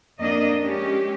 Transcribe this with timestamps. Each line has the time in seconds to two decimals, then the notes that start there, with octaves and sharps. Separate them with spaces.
0.18 F2 A#3 D4 D#5
0.60 G#3 C#4 G4